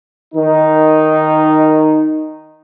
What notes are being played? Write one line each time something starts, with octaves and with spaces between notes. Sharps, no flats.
D#3 D#4